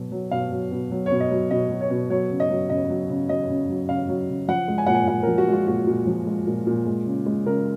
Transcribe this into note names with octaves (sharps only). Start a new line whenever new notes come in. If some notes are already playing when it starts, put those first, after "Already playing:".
Already playing: B2 F#3
F#3
B2 F5
F#3
B2
F#3
B2 C#5
D#5
F#3
B2 D#5
F#3
C#5
B2
F#3 C#5
C#3
D#5
F#3
C#3 D#5
F#3
C#3
F#3 D#5
C#3
F#3
C#3 F5
F#3
C#3
F3 F#5
G#3
G#5
A#2 F#5
G#5
A#2 F#5
F3 A#4
F#4
G#3 F4
A#2 F#4
A#2
F3
G#3
A#2
A#2
G#3
C#3
G#3
C#3 A#4